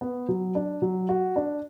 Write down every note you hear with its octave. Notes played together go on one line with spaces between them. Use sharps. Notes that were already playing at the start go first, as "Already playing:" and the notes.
B3
F#3
D4
F#3
F#4
D4